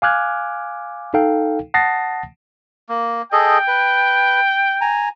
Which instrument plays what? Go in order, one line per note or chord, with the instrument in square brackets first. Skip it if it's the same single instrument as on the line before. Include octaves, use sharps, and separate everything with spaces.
[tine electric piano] F5 G#5 D6 F6 F#6 G#6
D#4 A4 F5 G5
F#5 A5 D#6 A6 A#6 C7
[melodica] A#3
[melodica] G#4 A4 D#5 [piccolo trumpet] G5
[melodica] B4
G#5 A#5